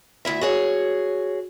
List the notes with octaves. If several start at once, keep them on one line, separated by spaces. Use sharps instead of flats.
D2 C#3 E4 E5
F#4 G#4 C#5